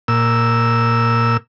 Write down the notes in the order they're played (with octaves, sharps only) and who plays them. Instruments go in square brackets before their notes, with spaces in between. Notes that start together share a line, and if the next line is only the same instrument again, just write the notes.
[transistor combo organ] A#2 E6